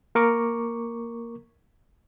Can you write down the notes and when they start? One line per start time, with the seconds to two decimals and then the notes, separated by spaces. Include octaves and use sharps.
0.15 A#3 A#4 C#6 D6